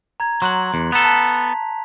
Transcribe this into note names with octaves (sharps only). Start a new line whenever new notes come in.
A#5 G#6
F#3 C6 F#6 F#7
E2
B3 A4 A#5 B6 F7
A5 F7